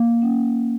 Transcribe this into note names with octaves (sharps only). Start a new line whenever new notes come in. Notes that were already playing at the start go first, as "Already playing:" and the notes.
Already playing: A#3
C#4